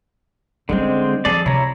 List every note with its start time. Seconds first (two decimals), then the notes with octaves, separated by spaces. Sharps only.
0.69 D3 G3 G#3 C4 C#4
1.25 F3 G#4 A4 D5
1.46 C3 E4 C#5 A#5